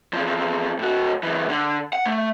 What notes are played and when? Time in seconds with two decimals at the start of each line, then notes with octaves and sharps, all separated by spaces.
0.13 E2 F3
0.79 A2 F#4
1.23 C#2 E3
1.49 D3
1.93 F#5
2.05 A3